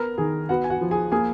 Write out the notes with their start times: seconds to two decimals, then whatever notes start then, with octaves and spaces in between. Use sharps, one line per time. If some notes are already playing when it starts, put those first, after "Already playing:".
Already playing: B3 A#4 A#5
0.18 D#3 G#4 G#5
0.49 B3 F#4 F#5
0.64 G#5
0.70 F#4 F#5
0.81 F3
0.91 G#4 G#5
1.12 A#3 G#4 G#5